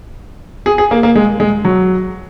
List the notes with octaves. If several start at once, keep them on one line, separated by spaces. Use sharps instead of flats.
G#4
G#4
A#3
A#3
G#3
G#3
F#3